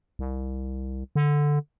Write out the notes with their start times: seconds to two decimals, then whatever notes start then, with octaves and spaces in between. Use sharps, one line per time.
0.19 C2
1.16 D3